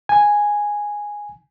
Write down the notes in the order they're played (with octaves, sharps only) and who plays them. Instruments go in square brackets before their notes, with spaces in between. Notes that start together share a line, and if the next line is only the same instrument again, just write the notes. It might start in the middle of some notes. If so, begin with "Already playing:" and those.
[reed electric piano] G#5